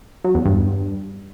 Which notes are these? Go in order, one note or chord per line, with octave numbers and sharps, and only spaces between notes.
F#3
E2
G2